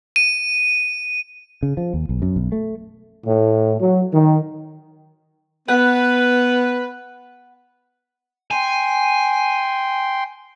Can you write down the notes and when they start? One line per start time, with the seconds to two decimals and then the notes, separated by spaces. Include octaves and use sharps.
0.16 D#7
1.63 C#3
1.77 F3
1.94 D#2
2.09 B1
2.22 F#2
2.36 B1
2.52 A3
3.25 A2
3.79 F#3
4.12 D#3
5.68 B3 B4 F#5
8.51 G5 G#5 C6